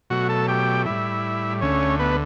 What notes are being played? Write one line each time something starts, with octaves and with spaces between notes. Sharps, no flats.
B2 F#3 A3 F#4 F#5
A4 A5
G4 G5
A2 G3 E4 E5
D2 D3 A3 C#4 C#5
B3 B4